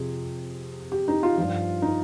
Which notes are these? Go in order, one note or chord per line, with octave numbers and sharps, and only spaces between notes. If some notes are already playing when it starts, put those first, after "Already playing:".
Already playing: F2 C3 F3 G#4
G4
D#4
F4
G2 F3
D#4